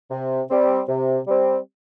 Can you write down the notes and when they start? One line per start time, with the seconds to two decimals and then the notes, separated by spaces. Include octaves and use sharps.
0.11 C3
0.49 G3 C4
0.88 C3
1.27 G3 C4